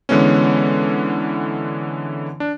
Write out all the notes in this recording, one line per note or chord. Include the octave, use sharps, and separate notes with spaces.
D3 E3 G#3 B3 C#4
D4